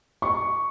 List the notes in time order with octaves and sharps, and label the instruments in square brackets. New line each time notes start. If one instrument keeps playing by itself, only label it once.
[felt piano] C#6